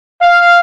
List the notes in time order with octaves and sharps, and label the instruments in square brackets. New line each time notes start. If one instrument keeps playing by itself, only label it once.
[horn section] F5